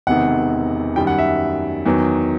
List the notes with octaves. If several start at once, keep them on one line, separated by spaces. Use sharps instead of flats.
E1 E2 C3 D#3 F#5
F#2 D#3 G3 G5
F#5
E5
E2 D#3 F#3